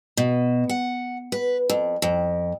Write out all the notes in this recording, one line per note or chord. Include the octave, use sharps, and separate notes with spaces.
B2
F#5
B4
F2
F2